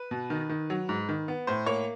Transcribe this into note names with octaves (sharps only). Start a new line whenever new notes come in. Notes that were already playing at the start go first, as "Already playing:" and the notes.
Already playing: B4
B2
D#3
D#3
F#3
G#2
D#3
B3
A2 C5
A#3 C#5